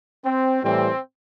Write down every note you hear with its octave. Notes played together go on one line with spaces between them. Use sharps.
C4
A2 E3 G3 C4